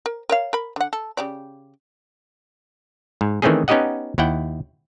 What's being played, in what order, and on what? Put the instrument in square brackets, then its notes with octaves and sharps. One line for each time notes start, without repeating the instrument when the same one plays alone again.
[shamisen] A#4
A#4 C#5 F5
A#4 B5
D3 F#5
A4
C#3 G4 D5
[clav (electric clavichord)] G#2
D#3 E3 A3 C4 C#4 G#4
B3 C#4 D#4 G4 D#5 F#5
D#2 E4 F#5 G5